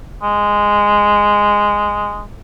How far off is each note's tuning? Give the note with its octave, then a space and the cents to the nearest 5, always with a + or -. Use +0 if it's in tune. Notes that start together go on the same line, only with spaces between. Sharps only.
G#3 -10